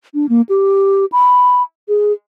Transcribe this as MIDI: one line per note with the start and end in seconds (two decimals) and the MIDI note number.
0.14 0.26 62
0.29 0.41 58
0.49 1.05 67
1.12 1.62 83
1.88 2.12 68